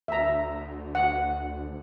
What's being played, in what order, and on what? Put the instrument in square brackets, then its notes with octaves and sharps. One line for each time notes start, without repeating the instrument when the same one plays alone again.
[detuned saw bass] D2 [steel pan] E5 A#5
[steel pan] F#5